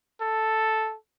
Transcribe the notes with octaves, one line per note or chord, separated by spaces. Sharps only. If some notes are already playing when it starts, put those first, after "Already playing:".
A4